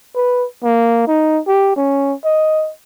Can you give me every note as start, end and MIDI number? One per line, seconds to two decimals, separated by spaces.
0.15 0.46 71
0.63 1.05 58
1.07 1.40 63
1.48 1.74 67
1.76 2.13 61
2.25 2.71 75